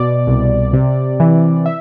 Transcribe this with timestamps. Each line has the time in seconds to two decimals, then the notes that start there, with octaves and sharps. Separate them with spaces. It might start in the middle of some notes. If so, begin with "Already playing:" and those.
Already playing: B2 D5
0.27 C2
0.73 C3
1.20 E3
1.66 E5